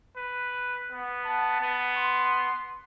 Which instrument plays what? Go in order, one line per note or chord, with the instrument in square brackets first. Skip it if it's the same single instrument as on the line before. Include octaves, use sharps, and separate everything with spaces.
[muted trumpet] B4
B3
[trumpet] A5
[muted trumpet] B3
[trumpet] C6